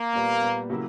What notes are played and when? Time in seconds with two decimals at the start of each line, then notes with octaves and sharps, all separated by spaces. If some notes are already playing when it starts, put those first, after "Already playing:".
Already playing: A#3
0.13 A#2 G3 B3
0.41 A#2 G3 B3
0.69 C#3 F#3 A#3 E4 G4